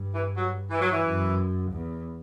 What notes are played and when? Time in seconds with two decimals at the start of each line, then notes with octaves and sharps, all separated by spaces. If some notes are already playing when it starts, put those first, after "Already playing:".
Already playing: G2
0.15 E3
0.37 F#3
0.70 E3
0.81 F#3
0.91 E3
1.04 F#2
1.72 E2